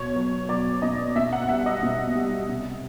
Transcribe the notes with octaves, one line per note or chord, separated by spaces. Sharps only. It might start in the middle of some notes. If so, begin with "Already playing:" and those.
Already playing: B2 C#5
F#3
F#3 D5
B2 D#5
B2 E5
F#5
G3 E5
D#5
B2
G3
C3